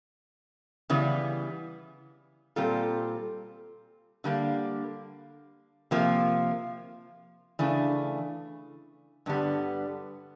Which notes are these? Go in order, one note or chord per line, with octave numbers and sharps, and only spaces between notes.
C#3 E3 G3 B3
A#2 G3 C4 F4 A4
D3 G3 A#3
C3 F3 A#3
C#3 E3 A3 D4
G2 D3 G3 B3